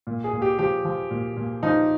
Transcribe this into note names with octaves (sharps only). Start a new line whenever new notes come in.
A#2
G#4
A#2
G4
F3 G4
F3
A#2
A#2
F3 D#4